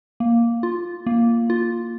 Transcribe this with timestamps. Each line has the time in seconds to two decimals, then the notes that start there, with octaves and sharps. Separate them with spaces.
0.20 A#3
0.63 F4
1.06 A#3
1.50 F4